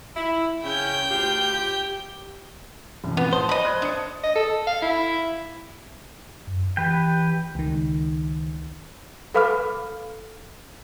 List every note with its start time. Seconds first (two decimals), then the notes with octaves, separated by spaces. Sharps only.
0.16 E4
0.64 C#3 C#4 G5 G6
1.10 D2 F4 G4
1.52 G4
3.04 E1 C2 F#2
3.17 A2 F3 B3
3.33 C5 A5 D#6
3.49 D#5 B5
3.64 D5 F#6 G#6
3.82 D4 D#6 C#7
4.24 D#5
4.35 A4
4.67 F5
4.82 E4
6.47 F#2
6.77 E3 G4 B4 G5
7.55 C#2 D#3
9.35 A4 B4 F5 B5 D6 F6